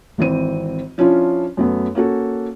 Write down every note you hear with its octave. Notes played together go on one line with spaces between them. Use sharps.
G#1 E3 C4 D#7
F3 C#4 D4 E4 F4
F#2 A3 B3
A#3 C#4 F#4 A4